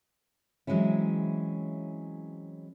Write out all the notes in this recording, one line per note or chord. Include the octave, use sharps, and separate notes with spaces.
E3 F#3 G#3 C4 C#4 E4